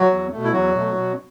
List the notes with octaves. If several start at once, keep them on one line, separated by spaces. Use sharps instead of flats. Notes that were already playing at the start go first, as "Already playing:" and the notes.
Already playing: F#3 F#4
E2
B2 A3
E4
E2 F#3 F#4
B2 A3
B2